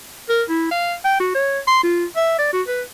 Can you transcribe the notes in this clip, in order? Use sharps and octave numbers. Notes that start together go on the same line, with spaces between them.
A#4
E4
F5
G5
F#4
C#5
C6
F4
E5
D5
F#4
B4